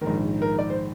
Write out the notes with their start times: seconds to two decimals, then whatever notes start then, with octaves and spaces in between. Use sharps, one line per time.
0.01 A#1 G#2 D#3 A#4
0.42 A#4
0.59 D5
0.70 C5